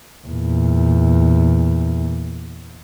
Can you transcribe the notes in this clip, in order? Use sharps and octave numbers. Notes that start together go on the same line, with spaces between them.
E2 A#2